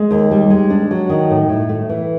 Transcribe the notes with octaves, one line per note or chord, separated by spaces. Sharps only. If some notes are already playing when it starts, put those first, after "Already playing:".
Already playing: G#3
D#2
G3
G#3
D4
F#3
D#3
A2
A2
A3
E3